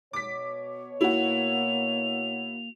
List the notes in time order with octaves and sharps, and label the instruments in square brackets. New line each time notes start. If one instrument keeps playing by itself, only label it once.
[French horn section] B2 C#5 [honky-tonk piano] D6 B6
[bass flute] A#3 [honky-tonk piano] E4 F#4 [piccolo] F7